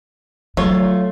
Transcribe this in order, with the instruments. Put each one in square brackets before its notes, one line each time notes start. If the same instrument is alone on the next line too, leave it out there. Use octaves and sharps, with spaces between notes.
[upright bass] F#3 [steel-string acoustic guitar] A3 [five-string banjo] F4 C#5